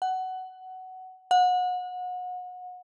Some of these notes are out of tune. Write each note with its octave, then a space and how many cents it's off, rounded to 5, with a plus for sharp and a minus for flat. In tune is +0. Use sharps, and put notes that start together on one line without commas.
F#5 +15
F#5 -30